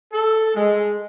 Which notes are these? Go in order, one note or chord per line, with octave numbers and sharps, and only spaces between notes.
A4
G#3